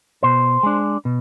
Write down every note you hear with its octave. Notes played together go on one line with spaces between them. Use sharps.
B2 C5
G#3 D4
B2